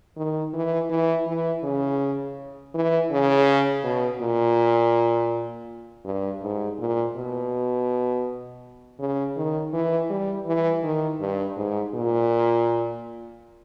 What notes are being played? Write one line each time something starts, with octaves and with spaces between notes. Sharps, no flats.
D#3
E3
E3
E3
C#3
E3
C#3
B2
A#2
G2
G#2
A#2
B2
C#3
D#3
E3
G3
E3
D#3
G2
G#2
A#2